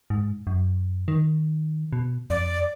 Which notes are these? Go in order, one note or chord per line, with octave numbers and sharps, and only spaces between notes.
G#2
F#2
D#3
B2
F2 D5